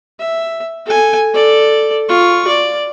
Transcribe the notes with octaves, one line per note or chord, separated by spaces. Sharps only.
E5
A4 G#5
A4 D5
F4 C#6
D5